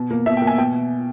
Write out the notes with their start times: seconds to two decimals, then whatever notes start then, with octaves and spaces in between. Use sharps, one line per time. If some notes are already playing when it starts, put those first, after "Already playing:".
Already playing: B2
0.11 A#3
0.26 B2 E5
0.37 G5
0.42 A#3
0.47 G#5
0.58 B2 G5